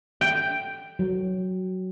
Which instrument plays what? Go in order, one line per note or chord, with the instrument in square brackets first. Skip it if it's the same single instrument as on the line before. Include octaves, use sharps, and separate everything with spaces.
[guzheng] G5
[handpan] F#3